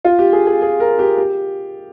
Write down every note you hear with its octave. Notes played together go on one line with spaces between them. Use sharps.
F4
G4
G#4
G#4
G#4
A#4
G4
G4